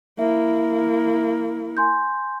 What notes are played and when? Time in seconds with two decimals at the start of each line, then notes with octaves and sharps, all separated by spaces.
0.19 A#3 E4 E5
1.77 G#5 C6 G6